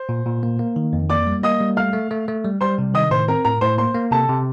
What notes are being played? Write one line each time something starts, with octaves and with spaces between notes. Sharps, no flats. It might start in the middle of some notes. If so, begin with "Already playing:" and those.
Already playing: C5
A#2
A#2
A#3
A#3
D#3
F2
A#3 D5 D6
G3
A#3 D#5 D#6
G3
A3 F5 F6
A3
A3
A3
G3
G3 C5 C6
C3
D#3 D#5 D#6
A2 C5 C6
C4 A#4 A#5
A2 A#4 A#5
A2 C5 C6
A#3 C5 C6
A#3
C3 A4 A5
C3